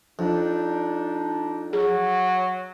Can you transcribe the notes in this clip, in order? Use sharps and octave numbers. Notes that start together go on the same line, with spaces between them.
F2 D4 D#4
F#3 G#4